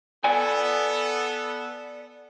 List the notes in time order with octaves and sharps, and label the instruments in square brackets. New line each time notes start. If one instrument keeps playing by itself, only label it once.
[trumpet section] B3 A4 [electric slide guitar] D5 G#5